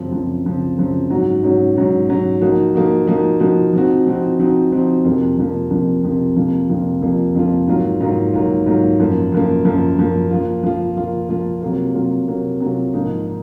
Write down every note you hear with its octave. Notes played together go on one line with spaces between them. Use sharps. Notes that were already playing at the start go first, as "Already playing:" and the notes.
Already playing: F#2 C#3 F3 C4
F#2 C#3 F3 C4
F#2 C#3 F3 C4
F#2 C#3 F3 C4
G#2 F#3 C#4 F#4
G#2 F#3 C#4 F#4
G#2 F#3 C#4 F#4
G#2 F#3 C#4 F#4
F3 A#3 D#4 F#4
F3 A#3 D#4 F#4
F3 A#3 D#4 F#4
F3 A#3 D#4 F#4
F3 C4 D#4 F#4
F3 C4 D#4 F#4
F3 C4 D#4 F#4
F3 C4 D#4 F#4
F2 C3 F3 A#3
F2 C3 F3 A#3
F2 C3 F3 A#3
F2 C3 F3 A#3
F2 C3 F3 A#3 F4
F2 C3 F3 A#3 F4
F2 C3 F3 A#3 F4
F2 C3 F3 A#3 F4
G#2 F#3 A#3 F4
G#2 F#3 A#3 F4
G#2 F#3 A#3 F4
G#2 F#3 A#3 F4
F#2 F3 A#3
F#2 F3 A#3
F#2 F3 A#3
F#2 F3 A#3
F3 A#3 F4
F3 A#3 F4
F3 A#3 F4
F3 A#3 F4
C3 F#3 A#3 F4
C3 F#3 A#3 F4
C3 F#3 A#3 F4
C3 F#3 A#3 F4
G#2 F3 A#3 D#4
D#4